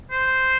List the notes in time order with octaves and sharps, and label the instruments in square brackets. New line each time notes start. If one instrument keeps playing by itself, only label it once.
[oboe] C5